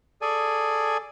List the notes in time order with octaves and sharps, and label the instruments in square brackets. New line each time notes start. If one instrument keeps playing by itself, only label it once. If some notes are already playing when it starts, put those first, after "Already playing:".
[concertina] G#4 A4 D5 G#5